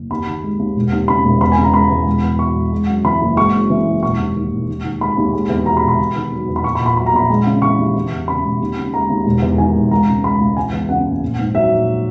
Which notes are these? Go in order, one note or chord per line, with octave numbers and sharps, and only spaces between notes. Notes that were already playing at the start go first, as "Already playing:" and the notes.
Already playing: F#1
D#2 B5
D#3
G#3
D#2
E1
D#2
C#3 B5
E1
E2 B5
G#5
C#3
A#5
G#3 B5
E2
E1
E2
B2 C#6
E1
G#3
F#2
E3 B5
F#1
G#3 C#6
F#2
E3
F#1
E1 C#6
D#2
D#3
E1
D#2
D#3
G#3 B5
D#2
G#3
E2
B2 A#5
B5
E1
B5
E2
D#3
F#3
E2
B5
A#1 C#6
B5
A#2
B5
F#3 B5
A#5
A#1 B5
G#3
C#3
E3 C#6
D#2
E3
E2
C#3 B5
E1
D#2
C#3
G#3 A#5
D#2
E1
E2
D#3 G#5
E1
C#2 A#5
C#3
G#3 B5
C#2
E3 G#5
E2
C#3 F#5
F#1
A#1
G#2
F#3 E5
A#1